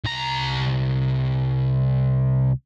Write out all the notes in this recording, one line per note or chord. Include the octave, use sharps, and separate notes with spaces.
C2 A#5